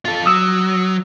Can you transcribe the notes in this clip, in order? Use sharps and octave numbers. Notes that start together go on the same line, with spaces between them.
F4 A4
F#3 D#6 E6